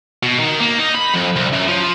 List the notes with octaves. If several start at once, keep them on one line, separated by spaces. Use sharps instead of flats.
B2
D#3
A#3
D#4
B5
F2
C2
F#2
F3